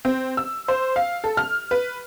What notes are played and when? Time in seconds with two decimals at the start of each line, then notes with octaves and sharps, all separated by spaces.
0.05 C4
0.37 E6
0.68 C5
0.96 F5
1.24 A4
1.37 F6
1.71 B4